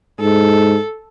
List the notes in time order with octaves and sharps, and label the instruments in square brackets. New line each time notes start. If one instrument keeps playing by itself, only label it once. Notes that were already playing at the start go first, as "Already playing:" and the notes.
[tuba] G#2 [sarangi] A4